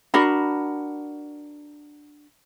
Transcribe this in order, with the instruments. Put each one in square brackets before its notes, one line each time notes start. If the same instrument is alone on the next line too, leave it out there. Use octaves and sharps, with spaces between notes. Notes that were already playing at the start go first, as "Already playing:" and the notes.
[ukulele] D4 F#4 A#4 B5